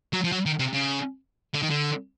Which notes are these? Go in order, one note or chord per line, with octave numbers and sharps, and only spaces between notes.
F#3
F3
F#3
D#3
C3
C#3
D3
D#3
D3